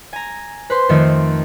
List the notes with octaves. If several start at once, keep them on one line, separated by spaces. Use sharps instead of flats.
G#5 A#5
B4 C5 C6
F2 D#3 A3 C4